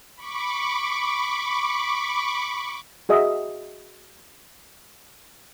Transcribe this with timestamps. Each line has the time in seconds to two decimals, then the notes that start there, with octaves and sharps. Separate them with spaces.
0.16 B5 C#6 D6
3.09 F#4 G#4 D#5 E5